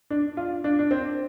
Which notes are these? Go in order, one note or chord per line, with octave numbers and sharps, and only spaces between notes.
D4
F4
D4
D4
C4